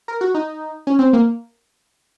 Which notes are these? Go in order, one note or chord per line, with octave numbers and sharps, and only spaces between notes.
A#4
F#4
D#4
C#4
C4
A#3